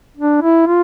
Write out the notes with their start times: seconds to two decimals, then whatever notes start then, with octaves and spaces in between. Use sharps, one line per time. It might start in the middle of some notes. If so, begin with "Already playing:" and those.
0.17 D4
0.42 E4
0.67 F4